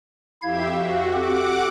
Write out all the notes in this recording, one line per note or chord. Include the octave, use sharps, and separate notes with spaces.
F2 E4 G4 E5 F5 G#6
F#4 F5
C4 G4 A4 F#5 D6